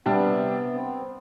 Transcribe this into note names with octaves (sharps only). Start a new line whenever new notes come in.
C3 G3 B3 D4
C4